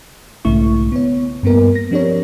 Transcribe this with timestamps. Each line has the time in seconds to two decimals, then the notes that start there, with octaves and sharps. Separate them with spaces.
0.45 B1 G#2 C#3 A3 E4 C#6
0.92 B3 C#5
1.43 G2 A#3 B3 A#4
1.75 A#6
1.91 F3 C4 D4 G4 A#4 C#5